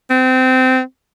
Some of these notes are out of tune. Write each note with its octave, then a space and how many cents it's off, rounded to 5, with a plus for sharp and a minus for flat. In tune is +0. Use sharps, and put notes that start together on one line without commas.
C4 -25